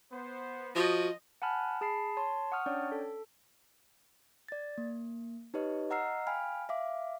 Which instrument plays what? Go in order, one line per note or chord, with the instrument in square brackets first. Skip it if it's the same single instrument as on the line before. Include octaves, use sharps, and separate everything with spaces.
[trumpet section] B3 C5
[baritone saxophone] F3 [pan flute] F#4 [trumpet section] D#5
[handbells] F#5 G#5 A5 B5 F6 F#6
G#4 A5 B5 C7
C#5 A5 C6
F#5 C#6 D#6 F6
C#4 D4 C#5 D5 G5
A4
[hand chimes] D5 A6
A#3
D#4 G4 B4 C#5 D#5
D#5 F#5 A#5 E6 F6 C7
F5 G5 G#5 B5 F6
E5 F5 D6